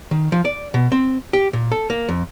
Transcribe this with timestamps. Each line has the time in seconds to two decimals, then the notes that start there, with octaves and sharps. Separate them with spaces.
0.11 D#3
0.32 F3
0.45 D5
0.74 B2
0.92 C4
1.33 G4
1.53 A#2
1.72 A4
1.90 A#3
2.09 F2